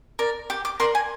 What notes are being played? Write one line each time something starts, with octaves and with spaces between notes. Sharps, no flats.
A#4 D5
G4 D6
D6
A#4 D5 C6
G#5